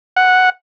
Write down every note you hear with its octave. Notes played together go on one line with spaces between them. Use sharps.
F#5